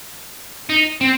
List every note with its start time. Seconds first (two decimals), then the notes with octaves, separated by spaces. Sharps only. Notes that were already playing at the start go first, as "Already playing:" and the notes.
0.70 D#4
1.01 C4